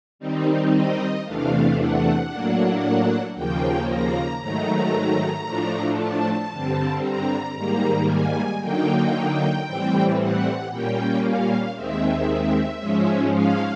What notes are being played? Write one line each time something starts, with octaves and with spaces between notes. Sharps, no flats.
D#3 G3 C4 D#4
D#5
E2 C3 E3 A3 D4 F5
F#5
A2 F#3 A#3 D4
D#2 C#3 F3 A#3 G5
A#5
G#2 D#3 F#3 A3 A#5
A2 F3 A3 D4
A5
G2 D3 G3 C4
A#5
G#2 D#3 G3 A#3 A#5
G#5
D3 F#3 A#3 D#4 G5
A2 E3 G3 C4
F#5
A#2 G3 A#3 C#4 G5
F5
D#2 D#3 G#3 C4 E5
G#2 F3 G#3 C#4
F5